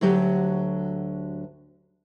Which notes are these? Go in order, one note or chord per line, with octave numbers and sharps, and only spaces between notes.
D2 D3 F#3 G4